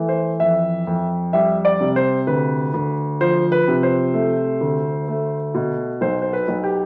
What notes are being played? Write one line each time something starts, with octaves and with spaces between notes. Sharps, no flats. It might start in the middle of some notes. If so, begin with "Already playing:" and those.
Already playing: E3 A3
C5
F2 E5
F2
G3 E5
D5
C3
C5
D2 B4
D2
F3 C5
B4
C3
C5
A3
D2
A3
B2
B1 C5
C5
B4
B1
G4